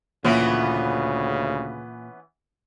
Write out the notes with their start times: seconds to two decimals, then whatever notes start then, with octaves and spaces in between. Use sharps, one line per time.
0.24 D2 A#2 C#3 E3 B3 C#4